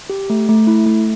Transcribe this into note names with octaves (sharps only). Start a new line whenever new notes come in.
G4
A3
A3
E4
A3